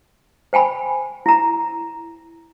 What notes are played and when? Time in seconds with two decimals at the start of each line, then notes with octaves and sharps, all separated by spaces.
0.53 C5 G5 G#5 B5
1.26 E4 A#5